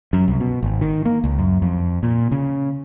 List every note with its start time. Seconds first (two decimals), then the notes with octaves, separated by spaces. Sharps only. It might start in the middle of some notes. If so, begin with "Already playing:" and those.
0.13 F#2
0.28 C2
0.40 B2
0.63 G#1
0.81 D#3
1.05 A#3
1.24 C#2
1.38 F#2
1.62 F2
2.03 A#2
2.32 C#3